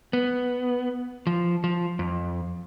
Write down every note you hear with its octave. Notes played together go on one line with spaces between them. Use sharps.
B3
F3
F3
F2